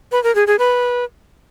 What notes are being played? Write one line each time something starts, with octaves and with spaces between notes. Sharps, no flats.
B4
A#4
G#4
G#4
B4